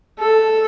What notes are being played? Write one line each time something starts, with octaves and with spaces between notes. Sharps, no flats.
A4